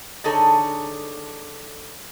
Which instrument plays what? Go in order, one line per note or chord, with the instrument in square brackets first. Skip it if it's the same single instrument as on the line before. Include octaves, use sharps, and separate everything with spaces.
[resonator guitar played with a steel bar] D3 D#4 G#4 A4 C#5